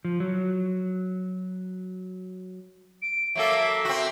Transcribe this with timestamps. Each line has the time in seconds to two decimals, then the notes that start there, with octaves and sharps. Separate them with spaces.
0.05 F3
0.20 F#3
3.02 D7
3.35 F#3 A#3 A4 E5
3.85 C4 F#4